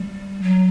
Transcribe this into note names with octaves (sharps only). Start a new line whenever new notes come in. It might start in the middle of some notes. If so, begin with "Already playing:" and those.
Already playing: G3
F#3